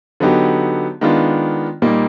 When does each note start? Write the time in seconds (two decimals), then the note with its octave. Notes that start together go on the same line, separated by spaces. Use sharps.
0.20 D3 F#3 B3 D#4 G4
1.01 D#3 G#3 B3 D4 F4
1.82 A#2 G3 A#3 D#4